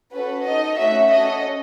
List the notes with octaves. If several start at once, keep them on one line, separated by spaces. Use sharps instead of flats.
C#4 F#4 A4 B4
D#4 A4 D#5
A3 C#4 F#4 E5
C#4 F#4 A4 D#5